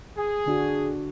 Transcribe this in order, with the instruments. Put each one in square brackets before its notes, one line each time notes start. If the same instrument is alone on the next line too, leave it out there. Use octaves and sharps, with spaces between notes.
[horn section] G#4
[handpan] D3 D4 F#4